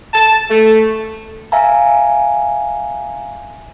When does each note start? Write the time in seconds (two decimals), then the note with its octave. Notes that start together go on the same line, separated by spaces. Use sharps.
0.14 A5
0.50 A3
1.52 E5 F5 G#5 A#5